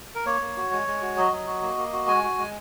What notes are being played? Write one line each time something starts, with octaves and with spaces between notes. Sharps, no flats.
A#4
A#3 C#5
A#3
F#4
G#3
G#3
F#4
F#3 D#5
F#3
F#4
A#3
A#3
F#4
G#3 G#5
F#4
G#3